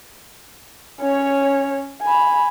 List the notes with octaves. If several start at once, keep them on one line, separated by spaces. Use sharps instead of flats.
C#4 C#5
G#5 B5